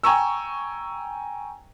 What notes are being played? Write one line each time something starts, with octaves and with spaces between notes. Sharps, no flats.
G5 G#5 A#5 C#6 E6